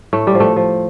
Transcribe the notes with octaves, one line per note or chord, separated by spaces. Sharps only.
A2 A3
G3
F3
A3
F3